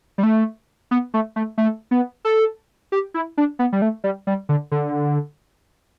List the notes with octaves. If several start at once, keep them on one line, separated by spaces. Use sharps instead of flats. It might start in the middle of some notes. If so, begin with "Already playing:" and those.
G3
A3
B3
A3
A3
A3
B3
A4
G4
E4
D4
B3
G3
A3
G3
G3
D3
D3